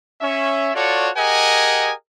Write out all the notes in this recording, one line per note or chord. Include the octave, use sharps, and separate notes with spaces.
C#4 E5
F4 F#4 A4 C#5 D5
G4 G#4 A#4 D#5 F#5 G#5